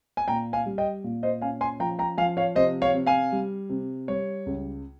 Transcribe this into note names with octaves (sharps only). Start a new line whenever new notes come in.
G#5
A#2 G5 A#5
F5 G#5
G3
D#5 G5
A#2
C5 D#5
C#4 F5 G#5
G#5 C6
F3 G5 A#5
G5 A#5
F3 F5 G#5
C#5 F5
C3 C5 D#5
C#5 F5
C3
F5 G#5
G3
C3
G3 C#5
C#2